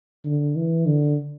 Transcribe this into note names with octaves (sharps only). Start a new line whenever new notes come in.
D3
E3
D3